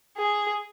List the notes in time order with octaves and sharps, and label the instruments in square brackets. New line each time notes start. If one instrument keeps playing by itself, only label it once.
[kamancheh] G#4